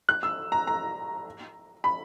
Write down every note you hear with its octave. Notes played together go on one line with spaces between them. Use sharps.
F#6
E6
A#5
A#5
B5